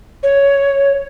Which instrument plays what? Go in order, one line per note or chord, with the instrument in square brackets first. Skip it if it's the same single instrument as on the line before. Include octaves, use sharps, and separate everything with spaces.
[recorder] C#5